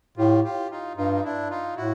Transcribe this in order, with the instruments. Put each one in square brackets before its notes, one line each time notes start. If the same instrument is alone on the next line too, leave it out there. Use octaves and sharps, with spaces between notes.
[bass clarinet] A2 [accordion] F4 G4
[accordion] F4 G4
D#4 F4
[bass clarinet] G2 [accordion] D#4 F4
[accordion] D#4
D4 E4
D#4 F4
[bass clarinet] A2 [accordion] E4 F#4